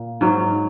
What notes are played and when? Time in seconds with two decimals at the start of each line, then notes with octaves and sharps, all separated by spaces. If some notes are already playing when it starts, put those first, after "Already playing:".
Already playing: A#2
0.21 G#2 F#3